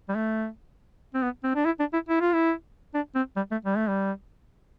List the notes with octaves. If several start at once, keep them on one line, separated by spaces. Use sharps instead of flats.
G3
A3
C4
B3
C4
D4
E4
D4
E4
E4
F4
E4
D4
C4
G3
A3
G3
A3
G3